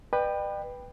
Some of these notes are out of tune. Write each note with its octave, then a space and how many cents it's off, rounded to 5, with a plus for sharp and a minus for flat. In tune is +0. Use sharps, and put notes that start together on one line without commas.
B4 +0 D5 +45 G5 +10